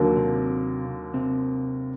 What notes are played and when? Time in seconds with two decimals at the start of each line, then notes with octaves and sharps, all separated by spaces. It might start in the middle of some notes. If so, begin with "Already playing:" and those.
Already playing: D#2 D3 F#3 A#3
0.16 C3 C4
1.14 C3 C4